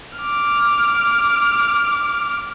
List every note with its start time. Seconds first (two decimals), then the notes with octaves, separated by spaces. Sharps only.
0.18 D6 F6